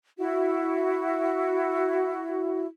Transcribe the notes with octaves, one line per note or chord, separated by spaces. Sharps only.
E4 F#4